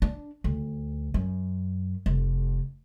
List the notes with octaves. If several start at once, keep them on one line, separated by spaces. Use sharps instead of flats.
D4
D2
F#2
F1